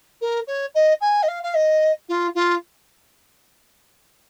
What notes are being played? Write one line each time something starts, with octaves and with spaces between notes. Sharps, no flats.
A#4
C#5
D#5
G#5
D#5
F5
F5
D#5
F4
F4